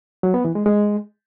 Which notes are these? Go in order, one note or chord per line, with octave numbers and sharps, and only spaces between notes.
F#3
B3
E3
G#3
G#3